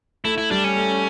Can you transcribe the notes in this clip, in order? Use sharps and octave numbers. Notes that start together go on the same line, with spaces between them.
A3 E4
E4
G3 D4
C#4
A3